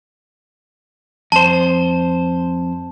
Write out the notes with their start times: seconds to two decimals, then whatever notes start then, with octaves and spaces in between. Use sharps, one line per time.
1.32 F2 C5 A5